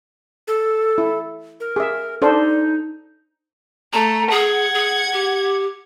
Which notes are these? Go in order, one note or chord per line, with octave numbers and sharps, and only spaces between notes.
A4
E4
A#4
G#4 E5
D4 D#4 A4 C5
A3 A#5
G#4 F#5 G#6
G#4
G4